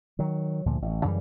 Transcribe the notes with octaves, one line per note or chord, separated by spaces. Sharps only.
D#3 F#3
D2 A#2 F3
A1
F#2 C#3 E3 G3